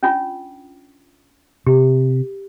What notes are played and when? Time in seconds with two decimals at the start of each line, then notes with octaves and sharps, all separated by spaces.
0.03 C#4 D4 F4
1.67 C3 G4